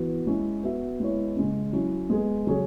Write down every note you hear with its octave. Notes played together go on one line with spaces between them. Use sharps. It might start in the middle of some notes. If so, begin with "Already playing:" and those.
Already playing: E3 B3 F#4
G#3 C#4 E4
B3 F#4 E5
G#3 B3 E4 C#5
C#3 G#3 C#4
F#3 C#4 E4
G#3 B3 G#4
C#3 F#3 C#4 G#4 C#5